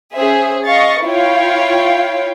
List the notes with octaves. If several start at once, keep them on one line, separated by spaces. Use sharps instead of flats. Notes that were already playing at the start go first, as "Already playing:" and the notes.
C#4 G#4 C5 E5
D#5 F5 C#6 A6
E4 F4 C#5 F5 G5